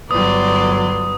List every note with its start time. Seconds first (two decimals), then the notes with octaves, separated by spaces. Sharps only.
0.11 G1 F#3 B4 D5 C6 D#6